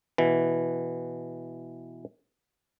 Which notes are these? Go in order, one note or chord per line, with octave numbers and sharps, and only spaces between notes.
B2 E3